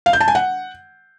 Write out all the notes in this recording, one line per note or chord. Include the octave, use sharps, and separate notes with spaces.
F5
G6
A5
G#5
F#5